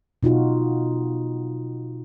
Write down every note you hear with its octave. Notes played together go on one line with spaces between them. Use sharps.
B2 D#4 F4 F#4